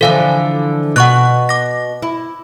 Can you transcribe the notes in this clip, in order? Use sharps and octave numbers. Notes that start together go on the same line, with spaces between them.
D3 E3 F3 A4 F5
B2 F#5 C#6 F#6
D6 A#6
E4